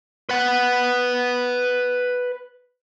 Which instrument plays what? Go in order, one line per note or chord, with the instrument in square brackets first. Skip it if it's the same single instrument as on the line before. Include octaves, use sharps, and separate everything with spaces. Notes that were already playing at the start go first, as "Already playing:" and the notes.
[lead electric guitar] B4 F#5